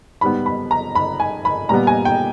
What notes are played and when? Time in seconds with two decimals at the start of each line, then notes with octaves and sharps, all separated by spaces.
0.21 G#2 G3 B3 B5
0.46 B5
0.71 A#5
0.95 B5
1.20 G#5
1.45 B5
1.69 A#2 G3 B3 A#5
1.87 G#5
2.05 G5